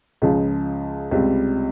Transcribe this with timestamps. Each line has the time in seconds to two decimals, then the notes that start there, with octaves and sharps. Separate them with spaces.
0.22 C#2 C#3 F3 G#3
1.11 C#2 C3 G3 C4